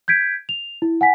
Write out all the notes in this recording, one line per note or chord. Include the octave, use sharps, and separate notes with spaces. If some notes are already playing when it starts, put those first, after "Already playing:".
G6 G#6 B6 D7
F7
E4
F#5 G#5 B6